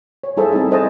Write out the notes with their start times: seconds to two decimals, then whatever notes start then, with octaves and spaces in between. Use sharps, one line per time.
0.24 C#5
0.37 G3 E4 G#4 A4 C5 E5
0.52 C4 D#4
0.71 A4 C5 D#5 E5 G#5 A5